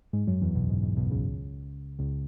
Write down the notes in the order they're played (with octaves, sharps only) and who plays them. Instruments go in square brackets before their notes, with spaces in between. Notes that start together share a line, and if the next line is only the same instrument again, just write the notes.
[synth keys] G#2 G#3
F#2 F#3
E2 E3
B1 B2
G#2
G#2
B1 B2
C#2 C#3
C#2 C#3